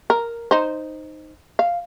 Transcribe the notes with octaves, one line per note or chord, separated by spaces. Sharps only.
A#4
D#4 C5
F5